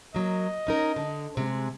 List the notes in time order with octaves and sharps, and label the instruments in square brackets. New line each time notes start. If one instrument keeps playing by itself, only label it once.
[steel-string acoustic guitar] F#3 A#3 [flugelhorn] D#5
[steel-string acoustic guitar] C#4 D#4 A#4
D3
C3 G#3